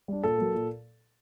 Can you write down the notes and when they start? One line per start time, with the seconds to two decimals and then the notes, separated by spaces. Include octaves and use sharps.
0.08 G3 D4
0.23 A#2 A4
0.38 F#3 A#3
0.54 A#2